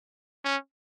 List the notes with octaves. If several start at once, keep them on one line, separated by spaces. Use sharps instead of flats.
C#4